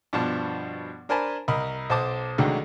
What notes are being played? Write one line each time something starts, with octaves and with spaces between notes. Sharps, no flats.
G2 B2 F3 A5
D4 A#4 C5 G#5 A5 B5
C2 A#4 D#5 B5
B1 C5 A5 D6 D#6
C2 D3 D#3 F#3 G#3 A3